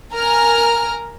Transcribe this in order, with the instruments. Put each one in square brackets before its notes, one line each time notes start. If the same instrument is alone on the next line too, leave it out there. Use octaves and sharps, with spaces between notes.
[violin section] A#4 G#5 A#5 F6